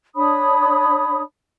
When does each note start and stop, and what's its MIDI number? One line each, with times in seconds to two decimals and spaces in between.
0.16 1.22 62
0.16 1.22 73
0.16 1.22 83
0.16 1.22 87